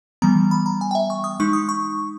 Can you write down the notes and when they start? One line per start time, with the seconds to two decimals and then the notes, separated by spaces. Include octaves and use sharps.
0.22 E3 G3 B3 A#5
0.51 B5
0.66 A#5
0.81 G#5
0.91 G5
0.95 E5
1.10 C#6
1.24 D#6
1.40 G#3 D#4 C#6
1.53 D#6
1.69 C#6